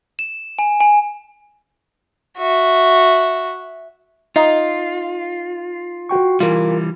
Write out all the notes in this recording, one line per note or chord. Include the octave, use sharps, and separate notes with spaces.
E7
G#5
G#5
F#4 E5
D#4 F4
F#4 G5 C#6
E3 G3 F4 A#4